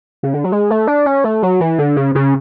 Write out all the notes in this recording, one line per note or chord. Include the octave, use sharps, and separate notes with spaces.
C#3
D3
F#3
G#3
A3
D4
C#4
A3
F#3
E3
D3
C#3
C#3